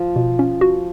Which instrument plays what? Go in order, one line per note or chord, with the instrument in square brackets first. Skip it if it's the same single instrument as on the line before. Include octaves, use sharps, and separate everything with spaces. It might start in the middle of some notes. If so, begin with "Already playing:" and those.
Already playing: [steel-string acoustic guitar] F3
[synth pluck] B2
C#4
F#4